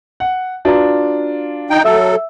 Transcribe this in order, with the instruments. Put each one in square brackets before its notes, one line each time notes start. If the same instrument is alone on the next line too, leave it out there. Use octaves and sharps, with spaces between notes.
[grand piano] F#5
[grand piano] D4 F4 [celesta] F#4 B4 A#5
[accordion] D#4 G5
[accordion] F#3 A4 [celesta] E5 E6